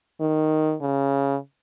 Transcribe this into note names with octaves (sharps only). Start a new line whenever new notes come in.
D#3
C#3